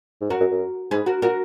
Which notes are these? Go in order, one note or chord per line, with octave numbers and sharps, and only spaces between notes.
G#2
F#2 F#4 A#4
F#2
F#2
G#2 G#4 B4
F#4 A#4
A#2 F#4 A#4